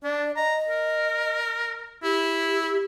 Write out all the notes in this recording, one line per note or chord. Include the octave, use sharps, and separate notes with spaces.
D4 D5
D#5 A#5
A#4
E4 G4